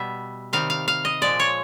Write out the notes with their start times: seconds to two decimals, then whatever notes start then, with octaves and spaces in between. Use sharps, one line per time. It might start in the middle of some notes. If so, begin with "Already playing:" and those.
Already playing: B2 G3 E5
0.53 C3 D#3 G3 F5
0.70 F5
0.88 F5
1.05 D#5
1.22 A#2 F3 G#3 D5
1.40 C#5